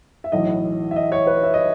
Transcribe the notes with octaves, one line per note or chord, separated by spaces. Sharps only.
E5
B1 A2 E3 D#5
E5
D#5
C#5
B4
E5
D#5